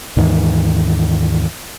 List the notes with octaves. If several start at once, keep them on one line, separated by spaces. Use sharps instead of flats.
D#2 G#2 D#3 E3